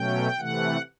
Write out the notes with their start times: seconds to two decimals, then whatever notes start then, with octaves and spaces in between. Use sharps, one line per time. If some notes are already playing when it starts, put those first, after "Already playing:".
Already playing: B2 F#3 A3 C#4 G5
0.38 C3 E3 A3 F#5